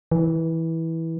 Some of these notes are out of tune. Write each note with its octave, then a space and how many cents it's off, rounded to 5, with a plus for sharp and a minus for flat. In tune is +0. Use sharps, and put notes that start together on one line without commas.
E3 -15